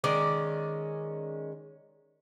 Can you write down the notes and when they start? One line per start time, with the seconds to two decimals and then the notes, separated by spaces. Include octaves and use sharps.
0.04 D#3 G#3 C#4 D5